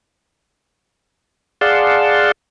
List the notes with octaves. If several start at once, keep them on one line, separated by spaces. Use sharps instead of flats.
G#4 D5 F5 F#5 A5 C6